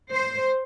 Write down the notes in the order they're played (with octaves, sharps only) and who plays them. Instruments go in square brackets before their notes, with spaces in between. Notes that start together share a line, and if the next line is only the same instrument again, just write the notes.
[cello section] C5